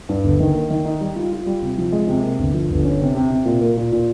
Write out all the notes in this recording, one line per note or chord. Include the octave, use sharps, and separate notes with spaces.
G2
G1
D#3
A#3
D#3
D#4
G3
F4
F4
G3
C3
F3
G#3
C3
A#3
G1
F3
G1
C#4
C3
C3
C3
A#2
A#3
A#2
A#2